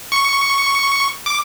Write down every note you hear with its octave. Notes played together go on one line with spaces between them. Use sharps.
C#6
D6